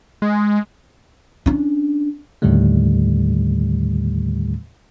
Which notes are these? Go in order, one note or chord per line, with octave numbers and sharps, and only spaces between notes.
G#3
C#4 D4
D#2 A2 D3 D#3 G3 A3